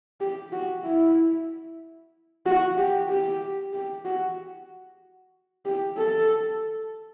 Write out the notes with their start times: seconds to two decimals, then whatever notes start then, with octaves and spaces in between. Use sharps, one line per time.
0.21 G4
0.52 F#4
0.84 E4
2.46 F#4
2.78 G4
3.09 G4
3.73 G4
4.05 F#4
5.65 G4
5.97 A4